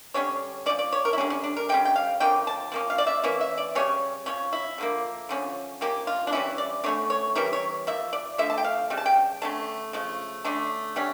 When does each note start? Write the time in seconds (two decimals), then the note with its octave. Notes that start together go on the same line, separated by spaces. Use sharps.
0.14 D3 G3 C#4 C#5
0.66 F3 C#4 D5
0.79 D5
0.92 C#5
1.05 A#4
1.13 E4
1.18 D3 G3 C#4 D4
1.30 C#4
1.44 D4
1.57 A#4
1.69 D3 G3 C#4 G5
1.85 G5
1.96 F5
2.20 D3 F3 A#3 C#4 G5
2.47 A5
2.72 F3 A#3 C#4
2.90 F5
2.98 D5
3.07 E5
3.23 E3 A#3 C#4 E5
3.41 E5
3.57 D5
3.75 C#3 G3 C#4 C#5
4.26 F3 C#4 C#5
4.53 E4
4.78 D3 F3 A#3
5.29 D3 F3 C#4
5.81 F3 A#3 C#4 G4
6.07 F4
6.27 D4
6.32 E3 G3 C#4 E4
6.58 D5
6.84 D3 A3 C#4 C#5
7.10 C#5
7.35 E3 G3 C#4 A#4
7.53 C#5
7.87 F3 A#3 E5
8.13 D5
8.38 D3 F3 A3 E5
8.50 A5
8.58 G5
8.64 F5
8.90 C#3 G3
8.97 A5
9.06 G5
9.42 D3 A3 C#4 A5
9.93 C#3 F3 A3
10.45 D3 A3 C#4 A5
10.96 D3 G3 C#4